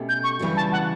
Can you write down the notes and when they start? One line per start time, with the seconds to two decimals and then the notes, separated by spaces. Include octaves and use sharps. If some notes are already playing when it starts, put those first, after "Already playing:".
Already playing: B2 A3 C#4 G4
0.09 G6
0.24 C#6
0.39 C#3 E3 G3 D4 F#4
0.57 A5
0.72 F#5